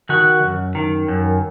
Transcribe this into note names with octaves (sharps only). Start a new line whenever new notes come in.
D#3 F#4
F#2
D#3
F#2